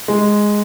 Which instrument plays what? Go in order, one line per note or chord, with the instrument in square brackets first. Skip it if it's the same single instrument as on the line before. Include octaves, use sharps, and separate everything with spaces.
[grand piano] G#3